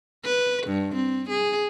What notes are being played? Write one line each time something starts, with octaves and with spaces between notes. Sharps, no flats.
B4
G2
C4
G#4